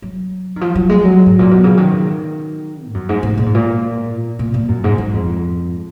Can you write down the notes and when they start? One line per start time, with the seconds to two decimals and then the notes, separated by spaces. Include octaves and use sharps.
0.02 F#3
0.56 D#3
0.61 F3
0.75 F#3
0.89 G#3
1.04 F#3
1.26 G#2
1.39 A#2
1.51 B2
1.64 C#3
1.77 D#3
2.87 G#2
2.94 F#2
3.09 G#2
3.23 G#2
3.38 A#2
3.46 G#2
3.55 A#2
4.39 A#2
4.54 A#2
4.68 F#2
4.84 G#2
4.98 G#2
5.13 F2